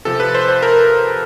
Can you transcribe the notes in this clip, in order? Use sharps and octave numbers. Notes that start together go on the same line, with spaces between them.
C3 F3 A4
B4
C5
C5
A#4